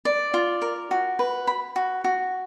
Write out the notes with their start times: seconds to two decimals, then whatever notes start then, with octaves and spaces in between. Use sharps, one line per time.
0.05 D5
0.34 F4
0.62 A#4
0.91 F#4
1.19 B4
1.47 B5
1.76 F#4
2.04 F#4